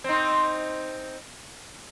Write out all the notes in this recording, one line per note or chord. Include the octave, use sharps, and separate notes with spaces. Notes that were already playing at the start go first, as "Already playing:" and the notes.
C4 D#4